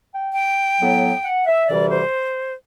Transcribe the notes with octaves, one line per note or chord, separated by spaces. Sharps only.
G5
G5
A2 F#3 B3
F#5
E5
D2 C3 E3 G3 D5
C5